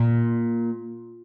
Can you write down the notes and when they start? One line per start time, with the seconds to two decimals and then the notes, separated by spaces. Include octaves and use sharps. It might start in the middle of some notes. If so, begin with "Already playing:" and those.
Already playing: A#2